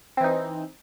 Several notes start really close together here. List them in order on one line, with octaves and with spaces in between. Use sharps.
C4 E3 D#4